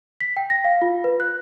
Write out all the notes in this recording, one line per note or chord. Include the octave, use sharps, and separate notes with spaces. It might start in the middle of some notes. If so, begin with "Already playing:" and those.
B6
G5
A#6
F5
F4
B4
F#6